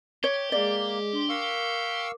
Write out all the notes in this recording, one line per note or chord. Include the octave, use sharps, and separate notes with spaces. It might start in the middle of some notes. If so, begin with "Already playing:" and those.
G4 C#5
G#3 A#3 G#4 D5 D#5
D4 C6
A#4 F5 C#6 D6 E6